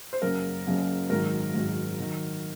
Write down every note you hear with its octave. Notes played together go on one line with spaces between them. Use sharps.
C5
F#1 F#2 C#3 F#3 A#4
F#1 F#2 C#3 F#3
G#1 G#2 D#3 F#3 A#4
G#1 G#2 D#3 F#3
D#3 F#3